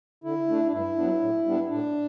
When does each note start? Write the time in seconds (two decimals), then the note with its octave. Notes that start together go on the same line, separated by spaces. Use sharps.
0.24 D3 E4
0.48 A3 D4
0.66 D4
0.72 G2 E4
0.96 F#3 B3 D4
1.20 A2
1.45 G3 B3 D4
1.69 A2 D4